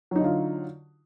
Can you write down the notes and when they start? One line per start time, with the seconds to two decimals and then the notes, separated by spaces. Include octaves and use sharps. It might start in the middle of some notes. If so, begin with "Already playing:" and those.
0.11 F#3
0.16 D#4
0.20 D3
0.24 F4